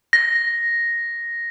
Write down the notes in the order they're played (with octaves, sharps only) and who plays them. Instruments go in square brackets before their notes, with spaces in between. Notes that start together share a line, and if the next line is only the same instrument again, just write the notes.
[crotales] A#6